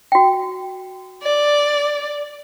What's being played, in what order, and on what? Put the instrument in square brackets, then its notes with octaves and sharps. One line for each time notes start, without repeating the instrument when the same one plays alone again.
[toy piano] F#4 G5
[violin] D5